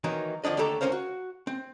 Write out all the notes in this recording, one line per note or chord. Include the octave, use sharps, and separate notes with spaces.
D#3 E3 F#3 A#3 D#4
D#2 D3 F3 D4 D#5
D#2 D3 A3 G4 A4 A#5
C#2 B2 C#4 A#4 C5 F5
F#4
C4